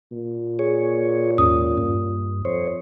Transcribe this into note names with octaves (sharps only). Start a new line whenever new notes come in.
A#2
G#4 C#5
D#2 G#2 C#4 D#6
G2
F2 C5 C#5